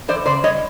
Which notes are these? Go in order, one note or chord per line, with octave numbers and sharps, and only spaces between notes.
E3 C5 D5
C#3 C5 D5
G3 C#5 D#5